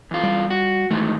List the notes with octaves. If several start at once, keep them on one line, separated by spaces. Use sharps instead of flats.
E2 F4
G3
F#4
G#2 D#3 E3 A3